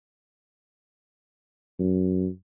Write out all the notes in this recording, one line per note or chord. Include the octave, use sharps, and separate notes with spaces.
F#2